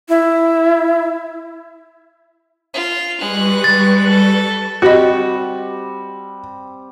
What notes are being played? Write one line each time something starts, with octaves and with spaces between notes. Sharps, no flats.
E4
F4
G3 G#3 B4 C#6 F#6
A6
A4
G3 C4 F#4 G4 D#5